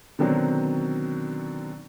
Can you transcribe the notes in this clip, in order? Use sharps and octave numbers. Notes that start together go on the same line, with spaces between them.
B2 D3 D#3 F#3 C4